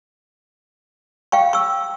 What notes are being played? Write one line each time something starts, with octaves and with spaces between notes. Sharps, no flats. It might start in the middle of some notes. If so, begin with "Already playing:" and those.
F5 G5 C#6
C#6 E6